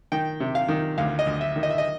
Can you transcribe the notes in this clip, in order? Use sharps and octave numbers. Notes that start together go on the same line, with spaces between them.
D#3 G5
C3
F5
D#3
D2 F5
D#5
D2
E5
D#3
D#5
E5
D#5